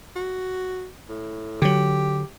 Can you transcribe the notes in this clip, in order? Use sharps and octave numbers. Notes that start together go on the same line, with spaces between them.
F#4
A2
D3 F#3 G4